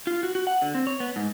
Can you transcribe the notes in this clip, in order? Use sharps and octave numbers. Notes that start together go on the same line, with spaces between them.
F4
F#4
F#4
F#5
D3
C4
C#5
B3
G#2